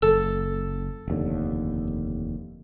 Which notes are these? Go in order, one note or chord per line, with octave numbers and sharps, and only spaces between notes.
F#1 A4
F1 D#2 D3